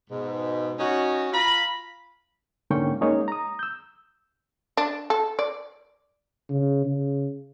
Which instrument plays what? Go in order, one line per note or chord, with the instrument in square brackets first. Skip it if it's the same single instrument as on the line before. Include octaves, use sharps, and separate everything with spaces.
[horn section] G#2 B2
C#4 D#4 F#4
F4 F5 A#5 B5
[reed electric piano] G#2 D3 A#3 C#4 G5 C#6
G#3 A#3 C#4 D#4 G#4 C#5
A#5 D#6
E6 G6
[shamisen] D4
A4
D5
[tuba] C#3
C#3